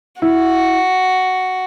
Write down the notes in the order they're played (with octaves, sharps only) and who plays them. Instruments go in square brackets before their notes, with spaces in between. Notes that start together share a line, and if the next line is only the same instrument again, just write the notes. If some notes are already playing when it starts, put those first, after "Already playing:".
[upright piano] E4 [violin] F#4